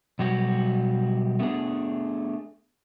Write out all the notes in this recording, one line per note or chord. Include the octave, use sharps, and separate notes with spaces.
B2 F#3 G3 F#4 G4
A3 B3 D4 G#4